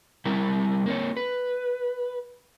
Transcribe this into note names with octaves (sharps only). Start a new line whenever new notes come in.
G3 C4 E4 A#4
A#3 C4 C#5
B4